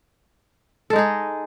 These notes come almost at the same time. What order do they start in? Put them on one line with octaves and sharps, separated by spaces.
A4 G#3 D#4 G#4